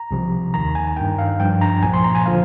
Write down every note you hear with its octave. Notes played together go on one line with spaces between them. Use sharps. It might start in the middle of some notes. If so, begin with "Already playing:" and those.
Already playing: A#5
C2 C3 F3
D#2 D#3 A#5
G#5
G2 D#3 G5
F5
G2 F3 G5
A#5
C2 A#2 F3 G#5
C6
A#5
G#5
D3 F3 F5